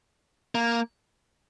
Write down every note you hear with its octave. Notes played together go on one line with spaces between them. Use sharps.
A#3